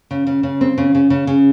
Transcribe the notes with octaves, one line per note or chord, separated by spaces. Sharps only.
C#3
C#3
C#3
C4
C#3
C#3
C#3
C#3